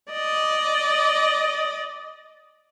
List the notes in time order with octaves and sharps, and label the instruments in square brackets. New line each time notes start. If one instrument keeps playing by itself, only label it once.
[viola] D5 D#5